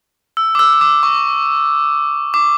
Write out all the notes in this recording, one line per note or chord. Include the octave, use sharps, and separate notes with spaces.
E6
D6
E6
E6
D6
C#6
D6